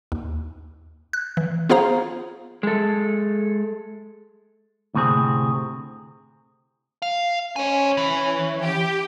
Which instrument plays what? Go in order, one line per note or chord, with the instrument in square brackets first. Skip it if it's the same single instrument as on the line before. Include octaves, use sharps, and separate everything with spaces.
[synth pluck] D#2
F#6
E3
B3 F4 G#4 C5 F5 A#5
[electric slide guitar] G#3 A4
[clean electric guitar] D2 A2 C3 C4 G#4
[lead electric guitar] F5
[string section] C#4 [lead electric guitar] C5 G#5
[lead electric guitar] E3
[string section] G4